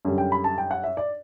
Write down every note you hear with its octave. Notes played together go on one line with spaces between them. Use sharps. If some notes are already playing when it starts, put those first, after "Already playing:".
F#2 D3 G3
G5
B5
A5
G5
F#5
E5
D5